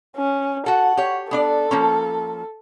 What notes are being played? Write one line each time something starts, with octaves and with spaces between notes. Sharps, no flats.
C#4
F#4 A4 F#5
G4 C#5
B3 D4 A4 D5
F3 A#3 C#4